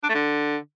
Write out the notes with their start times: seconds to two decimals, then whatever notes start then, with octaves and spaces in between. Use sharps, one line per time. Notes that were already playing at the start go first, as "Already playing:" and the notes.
0.03 D4
0.09 A3
0.15 D3